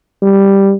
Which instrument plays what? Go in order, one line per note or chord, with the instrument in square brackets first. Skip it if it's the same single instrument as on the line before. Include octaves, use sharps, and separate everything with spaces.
[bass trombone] G3